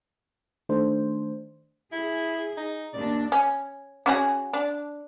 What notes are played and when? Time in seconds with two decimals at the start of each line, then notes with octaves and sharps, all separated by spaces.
0.69 D#3 A3 D4 C5
1.92 E4 G#4
2.57 D#4
2.94 D#2 D4 D5
3.32 C#4
4.06 C#4 F#4 G#4
4.53 D4